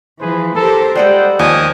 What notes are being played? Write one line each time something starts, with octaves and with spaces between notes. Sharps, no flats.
E3 F3 G#4 B4 C5
G4 A4 A#4 C5
G3 G#3 G#4 A4 C5 F#5 G5
D#2 F3 D#5 G#5 D#6